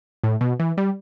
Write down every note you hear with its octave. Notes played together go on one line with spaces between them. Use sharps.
A2
B2
E3
G3